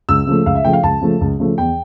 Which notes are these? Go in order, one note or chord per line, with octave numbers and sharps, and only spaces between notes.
C#2 E6
C#3 F3 A3
C#2 F5
E5
C#3 F3 A3 G5
F5
C#2 A5
C#3 F3 A3
C#2
C#3 F3 A3
E2 G5